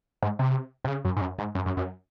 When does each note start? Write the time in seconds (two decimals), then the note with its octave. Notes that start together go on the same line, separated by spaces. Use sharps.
0.23 G#2
0.39 C3
0.84 C3
0.88 C#3
1.05 F#2
1.17 G#2
1.21 F#2
1.39 G#2
1.55 F#2
1.66 F#2
1.77 F#2